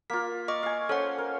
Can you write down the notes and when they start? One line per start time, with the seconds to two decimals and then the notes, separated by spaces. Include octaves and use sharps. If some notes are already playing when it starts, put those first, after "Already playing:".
0.10 A#3 F4 B6
0.48 D#5 C#6 D6
0.63 F5 G#5
0.89 C#4 A4 C5 F#5
1.18 A#4